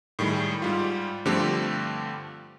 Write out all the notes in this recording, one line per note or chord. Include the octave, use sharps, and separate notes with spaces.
A2 D#3 G3 G#3
G#2 G3 F4
G2 D3 F3 A3 C4 G4